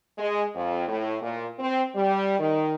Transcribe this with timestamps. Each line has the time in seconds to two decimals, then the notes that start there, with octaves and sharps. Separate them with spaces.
0.18 G#3
0.55 F2
0.88 A2
1.22 A#2
1.59 C4
1.95 G3
2.40 D#3